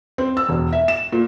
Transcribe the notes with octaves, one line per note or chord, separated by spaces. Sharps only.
C4
E6
E1
E5
E7
A#2